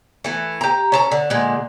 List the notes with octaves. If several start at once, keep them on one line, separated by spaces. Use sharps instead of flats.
E3 A3
G4 A#5
C#4 A4 A#5
D3
A#2 D3 G#3